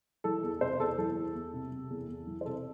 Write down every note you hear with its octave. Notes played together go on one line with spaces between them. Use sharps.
E3 A4
E2 A4
C3 C5
E2 A4
E3 A4
E2
E2
C3
C3
E2
E2
E3
C5
C3 A4